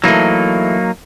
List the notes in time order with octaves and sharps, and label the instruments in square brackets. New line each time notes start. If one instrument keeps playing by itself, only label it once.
[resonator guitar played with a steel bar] E3 A3 [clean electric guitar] F#3 A#3 D#4